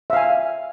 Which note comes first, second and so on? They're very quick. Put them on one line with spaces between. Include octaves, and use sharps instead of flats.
E5 F5 G#5